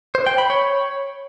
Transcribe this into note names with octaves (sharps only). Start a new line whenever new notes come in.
C5
G5
B5
C#5